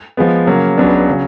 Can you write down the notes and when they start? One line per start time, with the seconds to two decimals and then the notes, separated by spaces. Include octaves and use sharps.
0.17 F3 G#3 B3
0.47 C#3 F#3 A#3
0.77 C#2 C#3 F#3 B3 D4
1.09 C#3 F#3